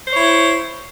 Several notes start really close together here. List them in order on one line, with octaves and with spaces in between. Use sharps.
C5 C#5 E4